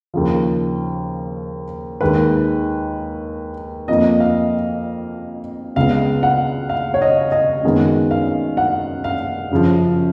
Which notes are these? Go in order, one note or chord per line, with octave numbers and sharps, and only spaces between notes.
D#2 C#3 F3
D#2 D#3 G#3 B4
F2 F3 A#3 D#5
F5
C#2 C#3 G#3 B3 F5
F#5
F5
C#5
D#5
D#5
F#2 D#3 G#3 B3
F5
F#5
F5
F#2 C#3 F3